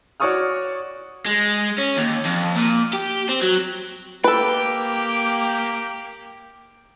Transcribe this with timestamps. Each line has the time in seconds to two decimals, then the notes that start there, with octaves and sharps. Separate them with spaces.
0.20 F#4 C#5 D5 C#6 D#6 F6
1.26 G#3
1.78 C#4
1.97 D#2
2.25 F2
2.56 A#2
2.93 G4
3.29 C4
3.41 F#3
4.24 A#3 G4 A4 B4 G5